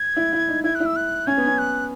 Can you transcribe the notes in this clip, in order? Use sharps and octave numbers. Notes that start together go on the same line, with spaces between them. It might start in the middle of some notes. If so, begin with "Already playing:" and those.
Already playing: G#6
E4
E4
D#4
E4 G#6
F#6
E4
E6
F#6
C#4 G#6
B3
C#4
F#6